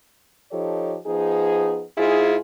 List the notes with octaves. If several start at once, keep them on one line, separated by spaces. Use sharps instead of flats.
F3 D#4 G4 A4 C#5
F3 B3 D#4 G#4
G#2 E4 F4 G#4